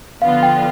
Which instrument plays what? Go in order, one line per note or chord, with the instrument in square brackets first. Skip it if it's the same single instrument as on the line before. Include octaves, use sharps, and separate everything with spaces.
[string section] D3 F3 B3 F4 [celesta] F5
[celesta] G5